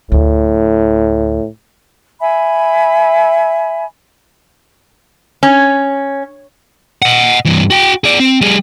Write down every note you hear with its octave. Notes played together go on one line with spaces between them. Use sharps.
D2 A2
E5 G#5 B5
C#4
D#5 F#5
G2 E3
F#4 G5
G#4 D5
C4
G3 G#4